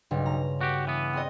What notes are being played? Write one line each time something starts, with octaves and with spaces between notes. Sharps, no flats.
B1 G2 C#3
A#5
F#4 G4
E3 B3
C4 G#4 D#5